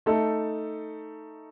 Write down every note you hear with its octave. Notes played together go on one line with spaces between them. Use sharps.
A3 D#4 A4